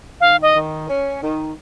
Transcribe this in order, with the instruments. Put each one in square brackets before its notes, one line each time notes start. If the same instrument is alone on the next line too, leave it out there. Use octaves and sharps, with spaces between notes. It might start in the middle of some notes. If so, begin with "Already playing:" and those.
[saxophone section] D#3 [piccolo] F5
[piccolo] D#5
[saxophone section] D#3
C#4
D#3